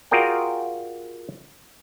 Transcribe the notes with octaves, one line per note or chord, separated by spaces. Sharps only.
F4 F#4 G#4 A#4 D5 G5